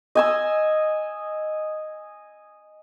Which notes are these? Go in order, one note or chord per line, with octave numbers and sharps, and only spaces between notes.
D#5 G#5 E6